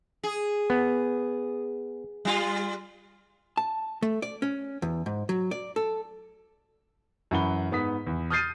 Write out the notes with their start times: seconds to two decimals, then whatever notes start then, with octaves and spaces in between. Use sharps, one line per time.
0.23 G#4
0.70 B3
2.25 G3 F4
3.57 A5
4.02 A3
4.22 D5
4.42 C#4
4.82 E2
5.06 G#2
5.29 F#3
5.51 D5
5.76 A4
7.31 F#2 E3 F#5 B5 G7
7.71 G#2 B3 D#6 B6
8.07 E2
8.30 D#6 F6 G6 A6 C7 D#7